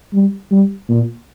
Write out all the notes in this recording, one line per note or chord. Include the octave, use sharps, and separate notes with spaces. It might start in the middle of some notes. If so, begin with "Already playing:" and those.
G3
G3
A#2